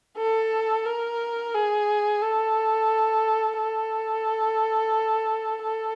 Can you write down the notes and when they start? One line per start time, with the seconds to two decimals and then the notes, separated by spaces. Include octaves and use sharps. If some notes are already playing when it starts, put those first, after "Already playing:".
0.17 A4
0.85 A#4
1.54 G#4
2.22 A4
3.59 A4
5.64 A4